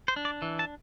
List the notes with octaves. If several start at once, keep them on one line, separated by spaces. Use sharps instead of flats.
C5
D4
D5
E3
A5